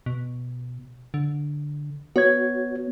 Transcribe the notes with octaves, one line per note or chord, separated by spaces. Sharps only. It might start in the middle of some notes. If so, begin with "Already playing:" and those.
B2
D3
B3 F#4 C#5 G#6